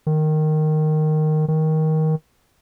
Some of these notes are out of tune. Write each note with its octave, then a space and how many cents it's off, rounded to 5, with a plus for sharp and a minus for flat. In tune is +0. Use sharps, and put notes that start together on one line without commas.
D#3 -10
D#3 +15